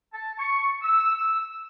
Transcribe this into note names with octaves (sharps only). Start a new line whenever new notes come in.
A5
C#6
E6